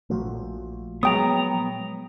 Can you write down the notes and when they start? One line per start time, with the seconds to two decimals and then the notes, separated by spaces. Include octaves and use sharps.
0.10 A#1 A#2 F3 A3 F#4
1.03 F#3 G#3 B3 C#5 G5 A#5 D#6